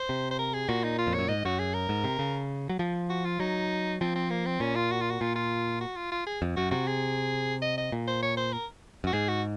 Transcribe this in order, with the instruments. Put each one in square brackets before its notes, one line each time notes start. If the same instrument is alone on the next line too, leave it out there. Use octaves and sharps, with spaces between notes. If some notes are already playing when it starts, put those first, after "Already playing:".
Already playing: [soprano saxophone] C5
[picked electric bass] C3
[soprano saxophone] C5
A#4
G#4
[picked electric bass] A#2 [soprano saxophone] F#4
[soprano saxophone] D#4
F4
[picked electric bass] F2
[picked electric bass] F#2 [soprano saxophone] C#5
[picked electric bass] G#2 [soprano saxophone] D#5
[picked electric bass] F#2 [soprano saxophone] F#4
[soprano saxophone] G#4
A#4
[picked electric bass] G#2
C3
C#3
F#3
F3
[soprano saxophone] F#4
F4
[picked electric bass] F#3 [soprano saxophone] D#4
[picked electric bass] F3 [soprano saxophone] C4
[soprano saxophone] C4
A#3
C4
[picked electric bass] A#2 [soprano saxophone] C#4
[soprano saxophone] F4
F#4
F4
F#4
[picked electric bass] A#2 [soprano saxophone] F4
[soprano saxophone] F4
F#4
F4
F4
G#4
[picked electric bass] F2
[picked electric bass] F#2 [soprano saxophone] F#4
[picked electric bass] C3 [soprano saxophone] F#4
[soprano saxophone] G#4
D#5
D#5
[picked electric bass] A#2
[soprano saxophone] C5
C#5
C5
A#4
[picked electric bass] F#2 [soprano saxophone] F#4
[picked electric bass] G#2 [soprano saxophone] G#4
[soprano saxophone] F#4